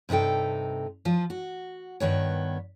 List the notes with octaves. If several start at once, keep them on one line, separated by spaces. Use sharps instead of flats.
G2 C3 D#4 A4 G5
F3 F4
F#4
G2 D#3 B3 C#5